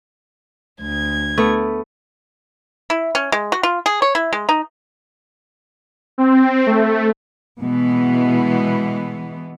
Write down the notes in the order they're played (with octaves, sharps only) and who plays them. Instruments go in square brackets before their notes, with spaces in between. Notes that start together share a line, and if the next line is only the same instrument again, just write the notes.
[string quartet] D2 G#6
[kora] A3 B3
[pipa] E4
C#4
G#3
F#4
F4
G#4
C#5
E4
G#3
D#4
[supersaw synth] C4
A3
[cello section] B2 E3 G#3 B3